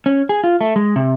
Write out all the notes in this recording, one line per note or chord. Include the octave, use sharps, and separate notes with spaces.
C#4
G#4
F4
A3
G#3
C3